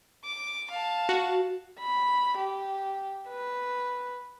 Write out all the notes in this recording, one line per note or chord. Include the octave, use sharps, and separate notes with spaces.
D6
F5 A5
F#4
B5
G4
B4